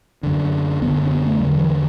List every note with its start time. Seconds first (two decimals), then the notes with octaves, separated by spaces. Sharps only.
0.23 F#2 D3
0.82 F#2 D3 B3
1.06 D4
1.11 B3
1.26 A3
1.40 E2 D3 F#3
1.59 E3